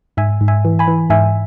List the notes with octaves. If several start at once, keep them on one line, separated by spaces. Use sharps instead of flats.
G#2 E5 G#5
G#2
E5 G#5
E3
G#5 B5
E3
G#2 E5 G#5